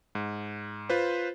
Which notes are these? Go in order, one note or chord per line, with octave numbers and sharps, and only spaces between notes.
G#2
F4 B4 C5